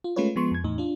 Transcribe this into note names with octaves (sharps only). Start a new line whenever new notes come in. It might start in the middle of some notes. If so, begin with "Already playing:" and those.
F4
G#3 A3 C#4 F4 B4 C#5
F3 G#3 B3 C6 C#6
F2 G#6
E2 A2 D#4
D4 F4